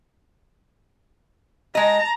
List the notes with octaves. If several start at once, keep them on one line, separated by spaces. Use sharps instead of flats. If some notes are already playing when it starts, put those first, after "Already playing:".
G#3 D#5 A5 A#5